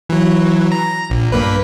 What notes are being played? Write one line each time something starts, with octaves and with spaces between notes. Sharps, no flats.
E3 F#3
A#5
A#1
G2 A#3 B4